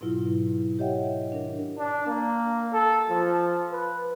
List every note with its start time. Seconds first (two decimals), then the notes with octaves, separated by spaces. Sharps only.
0.01 G#2 B2 F#3 E4 F4
0.79 G4 C#5 D#5 E5 F#5 G5
1.31 D#3 D4 A#4
1.78 D4
2.07 A#3
2.73 A4
3.09 F3
3.72 B4